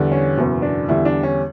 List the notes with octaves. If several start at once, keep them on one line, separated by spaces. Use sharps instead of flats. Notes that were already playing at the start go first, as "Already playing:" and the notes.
Already playing: E2 D3 G3
C#4
F#1 E2 B2
D4
E2 D3 G3 E4
D4
C#4